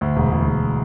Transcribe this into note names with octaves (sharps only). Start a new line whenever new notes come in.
D2
E1
E1
E1